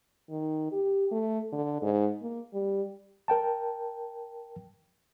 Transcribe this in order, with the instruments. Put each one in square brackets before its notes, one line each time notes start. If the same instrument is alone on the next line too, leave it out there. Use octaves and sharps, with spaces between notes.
[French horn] D#3
G4
A3
D3
G#2
A#3
G3
[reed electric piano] A#4 G5 A5